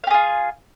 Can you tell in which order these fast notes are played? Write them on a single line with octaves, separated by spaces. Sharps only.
F5 G4 G#4 F4